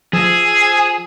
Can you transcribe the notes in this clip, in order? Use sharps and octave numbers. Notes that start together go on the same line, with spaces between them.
F3 G#4 G#5 D#6 E6